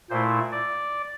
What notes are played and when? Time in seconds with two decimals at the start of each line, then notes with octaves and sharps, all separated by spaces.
0.10 A#2 A3 E4 C5
0.52 D5